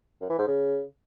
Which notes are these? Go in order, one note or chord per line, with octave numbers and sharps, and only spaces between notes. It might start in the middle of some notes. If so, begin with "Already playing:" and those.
F#2
E3
G#2
C#3